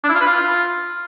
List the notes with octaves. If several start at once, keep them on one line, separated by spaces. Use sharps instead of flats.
D4
E4
F4
B4
F4